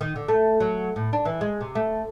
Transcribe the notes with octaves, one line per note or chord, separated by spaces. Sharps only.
D#3
D3
A3
F#3
A2
D4
E3
G#3
C3
A3